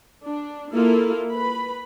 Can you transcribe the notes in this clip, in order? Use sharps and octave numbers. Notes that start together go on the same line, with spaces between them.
D4
A#3 E4 F4 A4
B4 B5